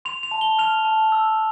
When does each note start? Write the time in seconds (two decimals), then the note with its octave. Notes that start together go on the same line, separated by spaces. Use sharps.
0.05 C6 F7
0.23 F7
0.31 A5
0.41 G7
0.59 F6 F7
0.85 A5
1.12 E6